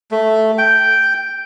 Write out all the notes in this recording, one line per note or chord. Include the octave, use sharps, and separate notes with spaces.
A3
G5